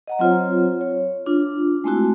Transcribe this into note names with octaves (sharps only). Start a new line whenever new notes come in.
D#5 F#5 A#5
F#3 C4 F4 C5 C#5
C#5
D4 F4
G#3 A3 C4 E4 F#4